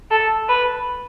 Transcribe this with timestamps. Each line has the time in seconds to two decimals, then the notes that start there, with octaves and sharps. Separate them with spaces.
0.11 A4
0.49 B4